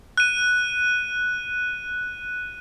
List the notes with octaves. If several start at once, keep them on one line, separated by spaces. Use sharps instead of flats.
F#6 D#7